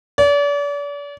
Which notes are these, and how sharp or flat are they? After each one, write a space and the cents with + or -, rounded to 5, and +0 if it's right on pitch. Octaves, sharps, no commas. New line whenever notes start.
D5 -40